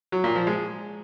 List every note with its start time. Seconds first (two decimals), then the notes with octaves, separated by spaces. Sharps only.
0.12 F#3
0.24 A#2
0.35 F3
0.47 G#3